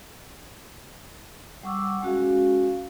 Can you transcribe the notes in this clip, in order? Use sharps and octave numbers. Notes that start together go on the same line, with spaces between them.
G3 F#5 C#6 D6 E6
G#3 C#4 F#4 G#4 F5